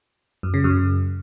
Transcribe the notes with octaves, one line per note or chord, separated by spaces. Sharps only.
F#2
C#3
F#2